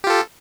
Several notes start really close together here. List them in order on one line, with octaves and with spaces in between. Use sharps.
G4 F4 A4